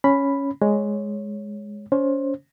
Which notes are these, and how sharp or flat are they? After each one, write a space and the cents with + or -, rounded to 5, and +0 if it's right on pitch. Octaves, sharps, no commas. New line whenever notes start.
C#4 +0 B5 +0
G#3 +0 C#5 +0
C#4 +30 C5 +20